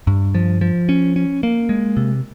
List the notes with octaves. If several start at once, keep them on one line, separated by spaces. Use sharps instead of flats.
G2
F3
F3
C#4
C#4
A#3
G#3
C3